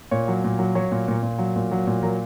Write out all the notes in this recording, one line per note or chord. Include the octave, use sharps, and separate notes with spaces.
A#2 C#5
F#3
A#2
F#3
F#3 C#5
A#2
A#2
A#2
F#3
A#2
F#3
A#2
F#3 A#4